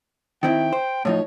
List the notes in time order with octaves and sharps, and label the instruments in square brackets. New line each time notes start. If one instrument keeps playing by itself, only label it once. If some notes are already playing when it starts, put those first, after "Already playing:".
[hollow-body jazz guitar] D#3 C4 E4 [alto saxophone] G5
[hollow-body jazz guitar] C5
[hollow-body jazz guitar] A2 F3 D#4 [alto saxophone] C#5